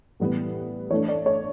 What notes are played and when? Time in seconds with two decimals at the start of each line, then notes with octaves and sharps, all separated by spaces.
0.20 A2 E3 G3 B3
0.90 E3 A3 D4 C#5
1.09 D5
1.26 C#5